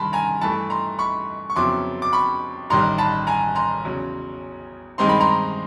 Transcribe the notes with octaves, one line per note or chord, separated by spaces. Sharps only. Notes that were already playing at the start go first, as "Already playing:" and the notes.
Already playing: G2 D#3 A5 B5 C6
G#5 A#5
G2 E3 A3 A5 B5
A#5 C6
B5 C#6
C#6
F2 C#3 F#3 B3 E4 C6 D6
D6
B5 C#6
A1 G2 D#3 G3 A#5 C6
A5 B5
G#5 A#5
A#5 C6
E2 C#3 F#3
G2 D#3 G#3 C4 D#4 C6
B5
A#5 C6